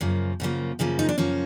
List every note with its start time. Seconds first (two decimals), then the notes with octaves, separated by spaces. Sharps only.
0.01 F#2 C#3 F3 A#3
0.40 F#2 C#3 F3 A#3
0.79 F#2 C#3 F3 A#3
0.99 D#4
1.09 D4
1.18 F#2 C#3 F3 A#3 C#4